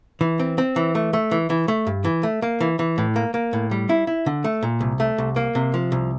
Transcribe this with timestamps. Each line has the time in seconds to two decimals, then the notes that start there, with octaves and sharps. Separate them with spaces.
0.21 E3
0.39 C4
0.58 C4
0.76 E3
0.95 A3
1.13 A3
1.31 E3
1.50 E3
1.68 A3
1.87 G2
2.05 E3
2.23 A3
2.42 A#3
2.61 E3
2.79 E3
2.98 A2
3.16 A#3
3.34 A#3
3.53 A2
3.71 G3
3.89 E4
4.07 E4
4.26 D3
4.44 A3
4.63 A#2
4.81 C2
5.00 A3
5.18 C2
5.36 A#3
5.55 C3
5.74 F3
5.92 C2